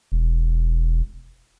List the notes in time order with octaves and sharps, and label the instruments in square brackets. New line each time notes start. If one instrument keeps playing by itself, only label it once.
[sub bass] E1